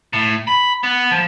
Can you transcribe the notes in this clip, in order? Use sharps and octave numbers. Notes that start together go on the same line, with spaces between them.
A2
B5
B3
F3